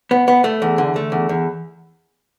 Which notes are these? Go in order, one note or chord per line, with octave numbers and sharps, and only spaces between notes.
B3
B3
A3
E2
D3
A3
E2
E2